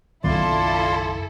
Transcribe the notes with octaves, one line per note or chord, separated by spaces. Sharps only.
F#1 B1 D#3 E4 F4 A4 D5 C6